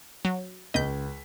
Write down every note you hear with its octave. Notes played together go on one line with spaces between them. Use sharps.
F#3
C#2 D#5 G6 B6